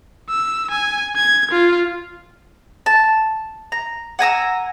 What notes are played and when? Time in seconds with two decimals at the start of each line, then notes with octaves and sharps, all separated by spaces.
0.29 E6
0.71 G#5
1.16 G#6
1.52 F4
2.86 A5
3.72 A#5
4.19 F#5 G#5 A#5 E6